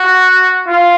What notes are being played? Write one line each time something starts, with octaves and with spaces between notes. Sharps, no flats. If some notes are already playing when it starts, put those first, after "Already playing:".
Already playing: F#4
F4